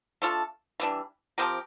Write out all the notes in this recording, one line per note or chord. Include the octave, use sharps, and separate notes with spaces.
A3 D4 F4 A4
E3 G3 D4
F3 C4 G4 A#4